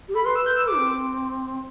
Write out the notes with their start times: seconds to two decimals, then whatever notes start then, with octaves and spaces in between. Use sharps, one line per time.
0.08 G4
0.14 A4 B5
0.25 B4 C6
0.36 E6
0.46 G6
0.57 E6
0.67 D6
0.77 C4